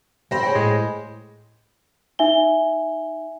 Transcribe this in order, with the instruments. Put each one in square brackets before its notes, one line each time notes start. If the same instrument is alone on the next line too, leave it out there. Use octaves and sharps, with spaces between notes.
[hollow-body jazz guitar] C2 F2 A3 [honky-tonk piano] G4 C5 B5 [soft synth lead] A#6
[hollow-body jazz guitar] G#4 C#5 G5
[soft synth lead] A2 [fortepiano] G#3
[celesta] D#4 E5 G#5 G7